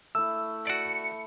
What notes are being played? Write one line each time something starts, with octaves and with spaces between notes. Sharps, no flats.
A3 E4 E6
F#4 D5 C#7